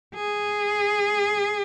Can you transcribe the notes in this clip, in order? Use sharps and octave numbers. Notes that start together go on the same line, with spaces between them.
G#4